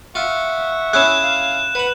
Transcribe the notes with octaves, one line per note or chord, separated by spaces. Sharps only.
F4 E5 F#5 C#6
C#4 E4 G#4 F#6 E7
F5
B4 F#5 B5